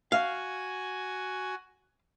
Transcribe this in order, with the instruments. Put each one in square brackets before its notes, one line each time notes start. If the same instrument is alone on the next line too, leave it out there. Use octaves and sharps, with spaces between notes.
[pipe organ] F#4 G#5 [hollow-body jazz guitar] F5